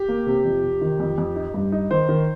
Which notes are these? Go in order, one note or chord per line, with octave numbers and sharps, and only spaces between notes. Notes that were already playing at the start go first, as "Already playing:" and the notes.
Already playing: G4
A#3
C3
F2
C3
D#3
F2
F2
D#4
G2
D#4
D#3 C5
D#3